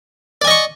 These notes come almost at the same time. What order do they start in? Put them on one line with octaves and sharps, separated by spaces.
D5 G#5 D#5 C#6